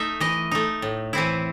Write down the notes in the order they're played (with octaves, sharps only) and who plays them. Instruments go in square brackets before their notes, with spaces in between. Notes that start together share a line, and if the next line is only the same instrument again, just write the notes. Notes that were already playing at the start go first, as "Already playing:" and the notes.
Already playing: [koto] A3 D#4 E5
E3 D#5
A3 D#4
A2
E3 C4 E4